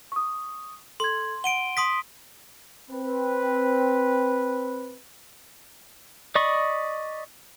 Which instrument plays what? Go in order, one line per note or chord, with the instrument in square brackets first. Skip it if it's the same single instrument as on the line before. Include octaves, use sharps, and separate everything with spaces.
[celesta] C#6 D#6
[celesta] A4 G#6 [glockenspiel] C6
[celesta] F#5 [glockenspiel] D7 D#7 G7
[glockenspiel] C6 D#6 B6
[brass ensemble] C4 B4
[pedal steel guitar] D5 D#5 B5 C#6